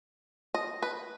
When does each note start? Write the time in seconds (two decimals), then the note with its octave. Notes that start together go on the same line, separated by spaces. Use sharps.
0.54 D#5
0.83 B4